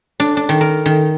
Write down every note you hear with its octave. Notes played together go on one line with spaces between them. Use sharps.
D4
D4
D#3
A#4
D#3